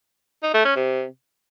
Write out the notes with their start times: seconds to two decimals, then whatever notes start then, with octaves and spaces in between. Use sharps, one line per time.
0.43 D#4
0.54 A3
0.65 C#4
0.76 C3